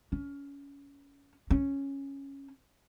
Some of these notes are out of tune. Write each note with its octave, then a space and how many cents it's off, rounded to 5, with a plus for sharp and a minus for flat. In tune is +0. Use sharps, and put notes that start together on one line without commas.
C#4 +25
C#4 -5